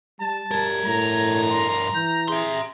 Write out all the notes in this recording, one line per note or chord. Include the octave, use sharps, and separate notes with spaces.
G3 A5
G2 G3 A#4 G#6
A2 A#5
C6
E3 G6
G#4 E5 C6